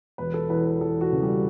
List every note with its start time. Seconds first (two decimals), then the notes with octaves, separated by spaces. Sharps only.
0.18 E1 B4
0.34 A4
0.49 E2 B4
0.65 B4
0.80 E2 A4
1.01 F#4
1.12 C#3
1.22 G3